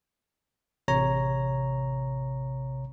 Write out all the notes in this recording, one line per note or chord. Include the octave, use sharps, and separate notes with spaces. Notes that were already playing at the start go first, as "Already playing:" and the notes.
A1 C3 C#5 A#5